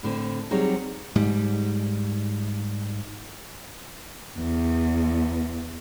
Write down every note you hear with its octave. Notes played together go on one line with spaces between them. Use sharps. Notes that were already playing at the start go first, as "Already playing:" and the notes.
A2 D3 C4
F#3 G3 C4 D#4 G#4 C#5
G#2 G3
E2